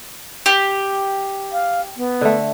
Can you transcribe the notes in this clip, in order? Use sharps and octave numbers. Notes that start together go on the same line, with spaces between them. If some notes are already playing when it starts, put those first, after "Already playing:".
G4
F5
B3
D3 A3